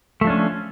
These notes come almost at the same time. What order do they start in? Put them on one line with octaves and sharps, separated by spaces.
A3 F3 D4 C#4